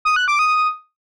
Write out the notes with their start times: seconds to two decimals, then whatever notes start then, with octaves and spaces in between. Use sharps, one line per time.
0.05 D#6
0.16 F#6
0.28 D6
0.39 D#6